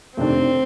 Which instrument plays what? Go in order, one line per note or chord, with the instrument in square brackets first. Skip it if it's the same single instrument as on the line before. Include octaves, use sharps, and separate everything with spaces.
[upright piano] F2 C3 D#3 A3 D4 [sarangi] C4